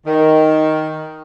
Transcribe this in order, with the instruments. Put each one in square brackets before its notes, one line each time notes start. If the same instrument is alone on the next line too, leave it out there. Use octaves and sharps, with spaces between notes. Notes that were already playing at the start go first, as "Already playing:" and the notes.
[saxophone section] D#3